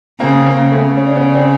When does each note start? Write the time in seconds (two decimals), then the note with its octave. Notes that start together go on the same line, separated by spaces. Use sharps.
0.20 C#3 A#3 C4
0.45 A#3 C4
0.58 C#3
0.72 A3 B3
0.97 C#4
1.07 D4
1.16 B3 C#4
1.35 C4 D4